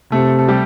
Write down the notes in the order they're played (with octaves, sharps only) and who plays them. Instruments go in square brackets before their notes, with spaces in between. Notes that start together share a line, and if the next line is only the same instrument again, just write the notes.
[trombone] C3 [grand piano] A3 A4
[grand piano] A4
G3 G4